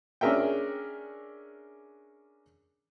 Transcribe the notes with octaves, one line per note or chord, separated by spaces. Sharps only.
C#4 D4 G#4 A#4 E5 G5